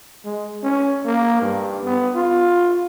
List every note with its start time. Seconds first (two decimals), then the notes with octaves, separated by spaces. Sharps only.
0.25 G#3
0.63 C#4
1.05 A#3
1.42 G2
1.84 B3
2.15 F4